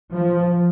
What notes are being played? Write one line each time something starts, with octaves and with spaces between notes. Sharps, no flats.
F3